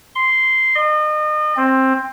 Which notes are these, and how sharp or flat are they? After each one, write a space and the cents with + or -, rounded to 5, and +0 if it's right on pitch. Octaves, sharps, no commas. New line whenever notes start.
C6 -10
D#5 -35
C4 +15